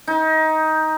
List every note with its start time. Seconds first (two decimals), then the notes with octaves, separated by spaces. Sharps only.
0.08 D#4